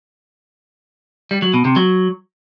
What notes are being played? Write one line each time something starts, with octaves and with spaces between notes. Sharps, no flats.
G3
F#3
B2
C3
F#3